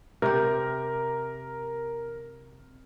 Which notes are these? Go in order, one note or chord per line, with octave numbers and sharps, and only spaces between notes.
C3 G4 A#4